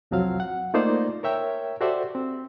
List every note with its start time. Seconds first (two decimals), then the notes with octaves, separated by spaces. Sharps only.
0.11 C2 F2 F3 F#3 C4 F5
0.40 F#5
0.74 A3 A#3 D#4 F4 C5 D5
1.23 A#4 C#5 E5 G5
1.81 F#4 G4 A4 C5 D5 E5
2.15 C4